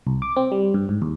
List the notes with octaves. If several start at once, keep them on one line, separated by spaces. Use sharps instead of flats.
C2
D6
C4
G3
G2
G#2
D#2